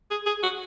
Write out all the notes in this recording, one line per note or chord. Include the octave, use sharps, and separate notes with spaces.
G#4
G#4
F#4